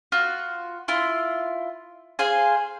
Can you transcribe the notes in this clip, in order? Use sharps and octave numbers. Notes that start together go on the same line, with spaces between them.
F4 F#4
E4 F4 C6
G#4 C5 F5 G#5